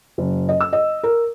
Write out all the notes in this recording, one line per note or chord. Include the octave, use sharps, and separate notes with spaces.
F#1
D#5
E6
D#5
A#4